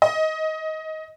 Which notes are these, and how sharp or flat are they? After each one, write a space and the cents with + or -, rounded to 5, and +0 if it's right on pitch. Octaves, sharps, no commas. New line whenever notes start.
D#5 +20